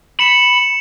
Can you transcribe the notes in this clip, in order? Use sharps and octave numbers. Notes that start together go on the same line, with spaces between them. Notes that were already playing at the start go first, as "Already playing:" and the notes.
B5 C#7 E7